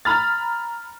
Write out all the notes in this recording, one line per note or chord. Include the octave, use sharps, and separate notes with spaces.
A#5 B5 F6 A6